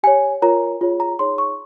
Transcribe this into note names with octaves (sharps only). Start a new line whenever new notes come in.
G4 C#5 G#5
F4 A#4 C#5 A#5
F4 G#4 C#5
A#5
D#4 G#4 C#5 C6
C#6